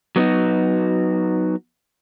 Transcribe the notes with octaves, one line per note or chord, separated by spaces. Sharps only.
F#3 B3 C#4 D#4 F#4